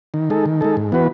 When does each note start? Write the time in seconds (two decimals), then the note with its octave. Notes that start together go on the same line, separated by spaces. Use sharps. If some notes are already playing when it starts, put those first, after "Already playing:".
0.14 D#3
0.30 G#3 D#4 A4
0.46 D#3
0.61 G#3 D#4 A4
0.77 G#2
0.92 E3 B3 F#4 B4